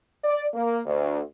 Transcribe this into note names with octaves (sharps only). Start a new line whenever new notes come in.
D5
A#3
D2